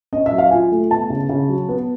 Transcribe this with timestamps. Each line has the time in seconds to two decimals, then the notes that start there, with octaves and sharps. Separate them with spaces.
0.12 C#4 D#5
0.26 E5
0.32 F#3
0.38 F5
0.51 F4 G#5
0.72 A3
0.90 B3 A5
1.10 C#3
1.29 C#3
1.49 F#3
1.69 B3